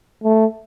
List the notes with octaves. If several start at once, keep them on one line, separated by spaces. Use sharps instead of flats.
A3